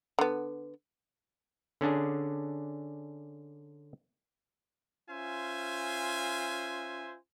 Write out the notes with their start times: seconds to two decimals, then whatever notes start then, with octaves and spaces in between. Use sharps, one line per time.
0.19 D3 B3
1.81 D3 C#4 D4 G#4
5.09 C#4 F4 C5 E5 G#5